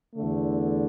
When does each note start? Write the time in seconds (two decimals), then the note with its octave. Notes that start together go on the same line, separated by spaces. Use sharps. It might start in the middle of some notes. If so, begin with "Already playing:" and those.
0.16 E2 D3 A3